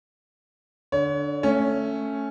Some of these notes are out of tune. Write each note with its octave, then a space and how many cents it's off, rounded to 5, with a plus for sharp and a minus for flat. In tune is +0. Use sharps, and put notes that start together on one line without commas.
D3 +0 C#5 +30
A3 +5 C#4 +0